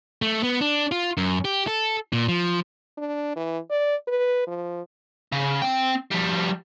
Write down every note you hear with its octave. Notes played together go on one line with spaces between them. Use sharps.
A3
B3
D4
F4
F#2
G4
A4
A#2
F3
D4
E3
D5
B4
F3
C#3
C4 G5
F3 G3